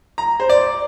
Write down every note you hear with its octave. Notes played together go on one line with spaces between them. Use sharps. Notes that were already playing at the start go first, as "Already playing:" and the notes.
A#5
C5
D5